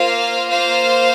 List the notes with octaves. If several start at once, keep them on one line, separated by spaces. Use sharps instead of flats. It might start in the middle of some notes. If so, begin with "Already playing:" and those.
Already playing: A#3 F4 C5 F5
C5 F5